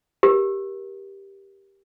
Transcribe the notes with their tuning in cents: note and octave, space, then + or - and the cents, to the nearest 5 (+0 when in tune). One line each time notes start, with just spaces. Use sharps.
G4 +0 A#4 +20